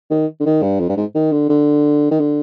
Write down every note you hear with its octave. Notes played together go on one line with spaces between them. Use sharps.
D#3
D3
D#3
G2
F2
G2
G#2
D#3
D3
D3
D#3
D3